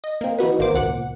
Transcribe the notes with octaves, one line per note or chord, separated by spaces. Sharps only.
D#5
A#3 C4
E3 D#4 F#4 B4
G#1 D#3 A#3 B3 C5 D6
C#2 A#2 F#5